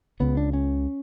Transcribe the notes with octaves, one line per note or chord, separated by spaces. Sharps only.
C#2 C#3 B3
D4
C#4